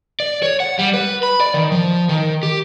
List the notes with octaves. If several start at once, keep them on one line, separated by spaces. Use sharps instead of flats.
D5
C#5
F#5
G3
B4
B5
D5
D#3
F3
D#3
G4